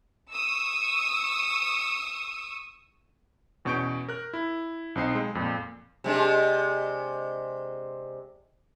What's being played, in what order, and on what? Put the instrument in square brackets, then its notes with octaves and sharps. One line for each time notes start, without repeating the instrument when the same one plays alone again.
[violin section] C#6 D#6 E6
[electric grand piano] E2 B2 C#4 C#6 G6 D7
A#4 F#6
E4
B1 C4 D#4 C7
G#3
F2 A#2
[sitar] C3 G#3 D4